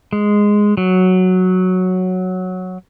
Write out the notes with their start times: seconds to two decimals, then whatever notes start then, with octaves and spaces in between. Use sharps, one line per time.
0.13 G#3
0.77 F#3